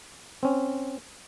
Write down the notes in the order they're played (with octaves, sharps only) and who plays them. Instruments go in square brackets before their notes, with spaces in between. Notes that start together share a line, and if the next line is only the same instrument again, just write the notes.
[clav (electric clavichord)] C4 C#4